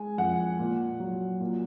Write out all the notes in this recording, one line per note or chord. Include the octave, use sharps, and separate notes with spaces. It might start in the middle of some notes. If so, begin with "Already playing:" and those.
Already playing: G#3 G#5
F2 F#5
A#2
F#3
A#2